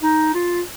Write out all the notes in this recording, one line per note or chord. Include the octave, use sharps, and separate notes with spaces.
D#4
F4